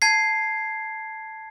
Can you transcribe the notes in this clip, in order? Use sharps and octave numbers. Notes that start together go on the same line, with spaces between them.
A5 G#6 C7